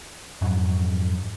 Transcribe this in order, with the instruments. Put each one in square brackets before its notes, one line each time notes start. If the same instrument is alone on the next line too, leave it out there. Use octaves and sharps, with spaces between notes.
[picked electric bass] F2 G#2 F#3